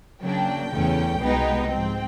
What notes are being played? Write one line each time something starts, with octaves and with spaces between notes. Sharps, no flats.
C#3 F#3 A#3 D4 G5
E2 C#3 E3 A3 C#4
C2 B2 G#3 B3 D#4
G#2 F3 G#3 C4 G5